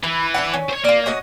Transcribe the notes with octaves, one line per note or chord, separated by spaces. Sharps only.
E3 E4
D4 E4 F#5
C#4
C5 C#5
A#3 F4 D5
C#4 F#4 D#5